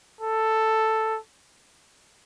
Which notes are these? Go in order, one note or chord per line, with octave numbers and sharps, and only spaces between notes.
A4